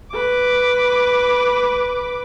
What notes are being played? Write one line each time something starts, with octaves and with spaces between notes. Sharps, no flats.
B4 D6